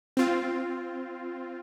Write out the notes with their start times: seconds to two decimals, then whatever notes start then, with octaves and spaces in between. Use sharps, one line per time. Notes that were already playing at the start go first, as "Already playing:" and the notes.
0.17 C4 F4